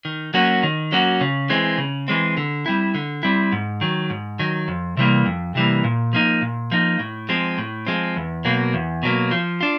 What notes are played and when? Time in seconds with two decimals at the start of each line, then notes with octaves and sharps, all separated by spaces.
0.05 D#3
0.34 F#3 A#3 C#4 F#4
0.63 D#3
0.92 F#3 A#3 C#4 F#4
1.21 C#3
1.49 E3 G#3 C4
1.78 C#3
2.08 E3 G#3 C4
2.37 D3
2.66 G3 C4 E4
2.95 D3
3.23 G3 C4 E4
3.52 G#2
3.81 D#3 F#3
4.10 G#2
4.39 D#3 F#3
4.68 F2
4.97 C3 E3 G3 A#3
5.26 F2
5.55 C3 E3 G3 A#3
5.84 A#2
6.13 F3 A#3 D#4
6.42 A#2
6.71 F3 A#3 D#4
6.99 A2
7.29 F3 G#3 C4
7.58 A2
7.87 F3 G#3 C4
8.16 E2
8.45 B2 F#3 A#3
8.74 E2
9.03 B2 F#3 A#3
9.31 F3
9.61 D4 F4